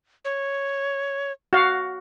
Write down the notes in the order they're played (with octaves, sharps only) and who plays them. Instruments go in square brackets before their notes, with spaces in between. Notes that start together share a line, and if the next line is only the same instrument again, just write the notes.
[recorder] C#5
[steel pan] F#4 F5